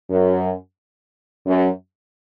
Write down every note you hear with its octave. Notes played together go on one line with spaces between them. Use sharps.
F#2
F#2